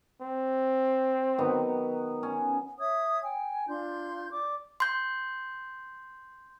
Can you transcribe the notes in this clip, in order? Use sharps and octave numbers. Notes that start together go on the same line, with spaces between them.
C4
D#3 F#3 B3
C#4
C#5 E5 D#6 G#6
G5 G#5
D4 F4 C6 G6
D5 D6
C6 G6